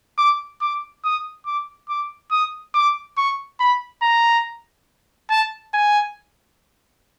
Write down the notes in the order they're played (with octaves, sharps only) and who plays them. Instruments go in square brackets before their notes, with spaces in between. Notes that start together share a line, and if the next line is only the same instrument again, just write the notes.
[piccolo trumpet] D6
D6
D#6
D6
D6
D#6
D6
C#6
B5
A#5
A5
G#5